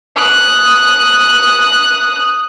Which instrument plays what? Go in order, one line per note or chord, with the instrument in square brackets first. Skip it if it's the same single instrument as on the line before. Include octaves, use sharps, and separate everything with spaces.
[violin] D#6 F#6